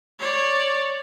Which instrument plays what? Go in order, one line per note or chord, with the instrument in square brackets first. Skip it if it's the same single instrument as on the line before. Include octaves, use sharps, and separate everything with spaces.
[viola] C#5 D5